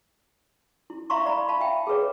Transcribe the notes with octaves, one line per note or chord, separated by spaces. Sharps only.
E4
E5 F5 A#5 C6 C#6
D5 A#5 B5
F5 A5 B5
E5 G5
G#4 A4 B4 C#5